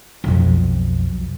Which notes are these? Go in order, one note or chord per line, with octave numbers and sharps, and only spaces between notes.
B1 F2